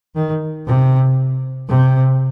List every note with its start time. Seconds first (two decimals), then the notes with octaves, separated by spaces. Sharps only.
0.16 D#3
0.66 C3
1.69 C3